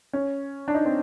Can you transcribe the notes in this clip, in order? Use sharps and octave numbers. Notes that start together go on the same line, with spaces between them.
C#4
D4
D#4
C4